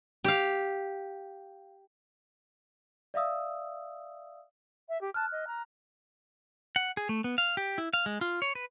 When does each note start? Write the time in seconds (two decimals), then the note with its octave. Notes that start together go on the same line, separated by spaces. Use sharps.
0.24 G4 F5
3.14 D5 E5 F5 D#6 E6
4.88 E5
5.01 G4
5.14 A5 F6 F#6
5.31 D#5
5.47 A#5
6.76 F#5
6.97 G#4
7.09 A3
7.24 B3
7.38 F5
7.57 G4
7.78 E4
7.93 F5
8.06 G#3
8.21 F4
8.42 C#5
8.55 B4